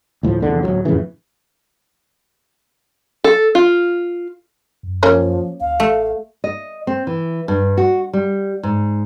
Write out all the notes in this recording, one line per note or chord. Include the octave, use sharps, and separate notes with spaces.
D2 A2 F3
F1 A#1 E2 D3
D1 D#2 F#3
F2 A2 C#3 E3
A4
F4
F#2
F3 A#3 C#4
D2 F5
A1 A3
D#5
C4
E3
G2
F#4
G3
G#2